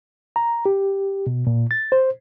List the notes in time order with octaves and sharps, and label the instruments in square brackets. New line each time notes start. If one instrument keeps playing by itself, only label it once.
[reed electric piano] A#5
G4
B2
A#2
A6
C5